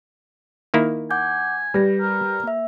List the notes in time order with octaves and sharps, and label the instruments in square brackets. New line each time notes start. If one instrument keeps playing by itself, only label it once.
[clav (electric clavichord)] D#3 A#3 E4
[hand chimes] F#5 D6 G6 [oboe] G#5
[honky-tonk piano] G3 [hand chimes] B4 A#6
[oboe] A#4
[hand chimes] A#3 E5